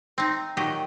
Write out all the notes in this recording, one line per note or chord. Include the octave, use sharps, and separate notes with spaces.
C4 D#4
A#2 D#3 F#3 G4 D#5